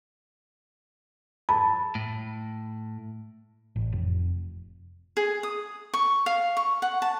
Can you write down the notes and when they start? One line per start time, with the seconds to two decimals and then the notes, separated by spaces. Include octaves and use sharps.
1.49 A5 B5
1.95 A2
3.76 A1
3.92 F1
5.17 G#4
5.43 D#6
5.94 C#6
6.26 F5
6.57 C#6
6.82 F#5
7.02 A5